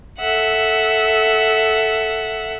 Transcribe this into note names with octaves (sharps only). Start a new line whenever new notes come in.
A4 E5 F#5